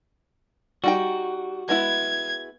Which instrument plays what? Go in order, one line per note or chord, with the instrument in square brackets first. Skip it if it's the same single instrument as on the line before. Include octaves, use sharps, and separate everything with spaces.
[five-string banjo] G3 D#4 G5 [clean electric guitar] F#4
[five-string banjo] G#3 B3 E4 [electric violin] G#6